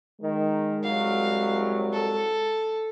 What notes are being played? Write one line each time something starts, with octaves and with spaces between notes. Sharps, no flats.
D#3 G#3
C2 F#3 F5
A4